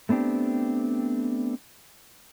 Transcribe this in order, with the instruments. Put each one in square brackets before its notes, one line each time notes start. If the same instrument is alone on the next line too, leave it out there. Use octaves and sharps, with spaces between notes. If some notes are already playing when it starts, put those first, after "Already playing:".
[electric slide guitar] A3 B3 C4 D4 G4